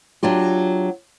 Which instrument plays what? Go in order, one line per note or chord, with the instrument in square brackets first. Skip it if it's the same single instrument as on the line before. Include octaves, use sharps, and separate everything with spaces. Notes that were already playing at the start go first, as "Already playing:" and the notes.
[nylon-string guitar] F#3 D4 F4 G4